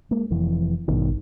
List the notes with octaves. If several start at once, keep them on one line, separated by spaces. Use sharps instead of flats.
G#3 A#3
F1 F2 E3
A1 G2 B2 D#3